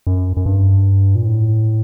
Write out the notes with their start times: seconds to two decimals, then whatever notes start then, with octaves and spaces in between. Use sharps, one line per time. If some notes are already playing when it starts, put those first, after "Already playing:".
0.07 F#2
0.37 F#2
0.46 G2
1.15 A#2
1.25 A2